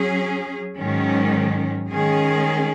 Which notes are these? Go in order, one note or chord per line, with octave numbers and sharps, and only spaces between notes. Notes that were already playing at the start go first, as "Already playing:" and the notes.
Already playing: F#3 C#4 G#4
G#2 D#3 F#3 C#4
D#3 G#3 C#4 G#4